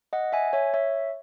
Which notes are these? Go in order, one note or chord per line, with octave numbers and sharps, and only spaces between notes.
D#5 F#5
E5 G#5
C#5 E5
C#5 E5